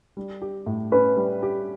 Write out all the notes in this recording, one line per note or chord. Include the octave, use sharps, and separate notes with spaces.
G3
G4
A2
C#4 B4
G3
G4